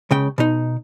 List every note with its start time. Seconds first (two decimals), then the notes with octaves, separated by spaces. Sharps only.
0.11 C#2 C#3 G5
0.38 B2 D#4